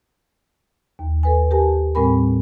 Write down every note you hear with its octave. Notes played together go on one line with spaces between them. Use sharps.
D#2
A4 B4 G#5
G4 A#4 G#5 A5
A2 G3 C4 A#4 G#5 B5